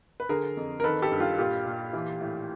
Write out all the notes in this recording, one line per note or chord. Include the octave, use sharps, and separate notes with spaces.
B4
D3 G#4 A#4
F2
A#4
D#3 A4 B4
G4 A4
G2
F4 G4
A#2 F4 G4
A#2
E3
A2